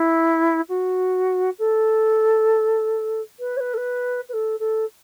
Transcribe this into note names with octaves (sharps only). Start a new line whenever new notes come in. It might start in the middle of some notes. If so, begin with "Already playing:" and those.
Already playing: E4
F#4
A4
B4
C#5
B4
A4
B4
B4
A4
A4